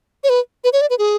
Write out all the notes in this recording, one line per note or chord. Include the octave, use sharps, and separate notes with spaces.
C#5
B4
B4
C#5
D5
B4
G#4